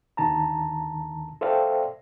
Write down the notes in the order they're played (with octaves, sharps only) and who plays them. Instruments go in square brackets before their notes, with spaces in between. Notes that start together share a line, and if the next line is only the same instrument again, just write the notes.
[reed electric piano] D#2 D3 D#3 A5 A#5
A4 C5 D5 E5 F5 G5